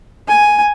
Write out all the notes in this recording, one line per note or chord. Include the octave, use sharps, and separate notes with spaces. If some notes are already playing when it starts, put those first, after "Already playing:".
G#5